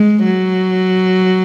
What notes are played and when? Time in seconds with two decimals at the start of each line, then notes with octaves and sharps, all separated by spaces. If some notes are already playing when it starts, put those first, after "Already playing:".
Already playing: G#3
0.24 F#3